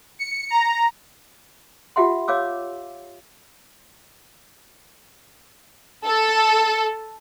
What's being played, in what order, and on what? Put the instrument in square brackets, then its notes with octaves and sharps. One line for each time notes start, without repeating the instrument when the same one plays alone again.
[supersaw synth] C#7
A#5
[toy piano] F4 G4 E5 F#5 C6
C#5 F5 D6 E6
[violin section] A4